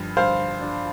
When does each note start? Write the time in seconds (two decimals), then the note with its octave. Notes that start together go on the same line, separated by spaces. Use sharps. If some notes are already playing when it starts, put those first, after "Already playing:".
Already playing: G2 F3
0.17 G2 C5 F5
0.61 D4